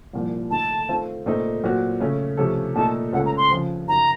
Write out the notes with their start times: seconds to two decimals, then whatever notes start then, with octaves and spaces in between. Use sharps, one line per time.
0.13 C2 A#2 F3
0.50 D#3 A3 D#4 A4 A5
0.89 D#3 A3 C4 F4
1.26 A#2 A3 C4 D#4
1.63 A#2 F#3 C4 F#4
2.00 C#3 A3 C#4
2.37 C3 F3 A3 C#4 A4
2.75 A#2 A3 D#4 A4 A5
3.13 C#2 C#3 A3 C#4 A4 F#5
3.26 A#5
3.37 C6
3.50 C#3 F3 C4
3.88 F#2 D#3 F#3 A#5